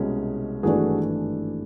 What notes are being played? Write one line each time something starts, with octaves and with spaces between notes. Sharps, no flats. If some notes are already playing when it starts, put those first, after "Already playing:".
Already playing: C2 B2 G#3 C#4
G#1 G2 E3 A3 D4 F#4 G#4